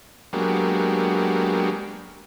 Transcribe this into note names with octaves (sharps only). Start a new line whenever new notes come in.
F#3 G#3 A#3 B3 D4 G4